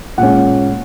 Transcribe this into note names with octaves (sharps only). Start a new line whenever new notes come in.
A#2 G#3 C#4 F#5